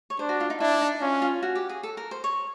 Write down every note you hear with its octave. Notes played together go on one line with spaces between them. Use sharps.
C#5
D4 C5
F#4
F4
D#4
D4 E4
D#4
C#4 F4
F4
F#4
G4
G#4
A4
A#4
C5
C#5